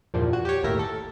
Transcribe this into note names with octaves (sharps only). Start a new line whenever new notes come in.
E2 G2 A#2 F3
F#4
G4 C#5
G1 D#2 A2 G4 A#4 E5
A4